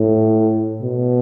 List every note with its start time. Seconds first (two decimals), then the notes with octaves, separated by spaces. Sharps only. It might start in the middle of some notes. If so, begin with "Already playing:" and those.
Already playing: A2
0.82 B2